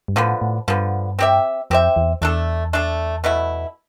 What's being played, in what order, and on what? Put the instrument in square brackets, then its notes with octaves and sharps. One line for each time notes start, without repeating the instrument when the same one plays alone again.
[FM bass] G2
[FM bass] A2 [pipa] D3 F3 B3
[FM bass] A2
[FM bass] G2 [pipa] D3 F3 B3
[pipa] C4 G4 C5 E5
[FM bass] F2 [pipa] C4 G4 C5 E5
[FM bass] E2
[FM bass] E2 [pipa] A3 D4 A4
[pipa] A3 D4 A4
B2 A3 E4